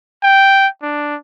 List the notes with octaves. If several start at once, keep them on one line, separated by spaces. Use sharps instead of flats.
G5
D4